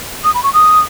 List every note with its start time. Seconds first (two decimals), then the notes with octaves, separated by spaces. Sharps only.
0.24 D#6
0.34 B5
0.44 C#6
0.54 D#6